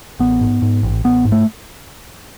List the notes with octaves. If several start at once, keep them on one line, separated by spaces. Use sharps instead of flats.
A1 B3
G#2
G#2
A1
A1 B3
G#2
A3